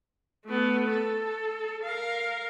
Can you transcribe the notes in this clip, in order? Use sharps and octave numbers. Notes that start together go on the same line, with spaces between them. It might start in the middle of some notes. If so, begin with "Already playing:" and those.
A3 B3
A4
A#4 F5